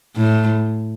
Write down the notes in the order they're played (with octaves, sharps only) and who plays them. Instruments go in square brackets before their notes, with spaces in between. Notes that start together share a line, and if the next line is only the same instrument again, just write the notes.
[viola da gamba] A2